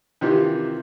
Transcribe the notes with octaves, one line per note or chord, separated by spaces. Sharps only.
C3 D#3 E3 D#4 F4 G4